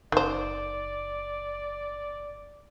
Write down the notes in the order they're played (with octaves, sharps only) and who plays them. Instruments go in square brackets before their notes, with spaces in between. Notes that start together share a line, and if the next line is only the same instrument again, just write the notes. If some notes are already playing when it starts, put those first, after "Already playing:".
[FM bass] F#1 [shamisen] D#3 C5 [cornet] D5